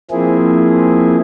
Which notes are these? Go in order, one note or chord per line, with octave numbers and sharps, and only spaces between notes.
F3 A#3 C4 E4 G#4